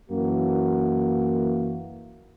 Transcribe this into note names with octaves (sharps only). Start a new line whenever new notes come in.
F#2 E3 A#3 F#4